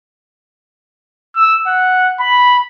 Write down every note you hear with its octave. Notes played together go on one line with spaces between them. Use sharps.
E6
F#5
B5